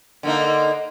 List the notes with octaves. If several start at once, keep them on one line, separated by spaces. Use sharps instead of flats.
D3 A#3 D#4